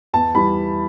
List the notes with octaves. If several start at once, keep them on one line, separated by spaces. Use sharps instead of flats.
E2 A5
E3 G3 B5